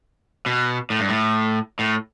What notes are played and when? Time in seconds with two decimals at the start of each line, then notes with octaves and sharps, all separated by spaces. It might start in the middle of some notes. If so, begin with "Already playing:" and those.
0.46 B2
0.90 A2
1.00 G2
1.09 A2
1.79 A2